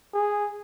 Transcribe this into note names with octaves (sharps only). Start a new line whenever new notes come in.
G#4